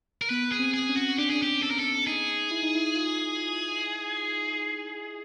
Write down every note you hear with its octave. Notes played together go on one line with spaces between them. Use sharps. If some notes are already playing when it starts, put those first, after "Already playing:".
A#4
B3 B4
G#4
C4
G#4
C#4
F#4
D4 G4
C#4
D4 G#4
G4
A4
A#4
A4
D#4 G#4
E4
D#4
E4
F4